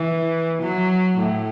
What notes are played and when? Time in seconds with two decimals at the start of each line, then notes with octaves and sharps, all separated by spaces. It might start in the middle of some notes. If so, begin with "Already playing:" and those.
Already playing: E3
0.62 F#3
1.18 A2